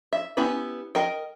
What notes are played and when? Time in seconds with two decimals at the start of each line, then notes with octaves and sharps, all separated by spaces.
0.13 E5
0.37 B3 C#4 E4 G4 B4
0.95 A#4 D#5 G5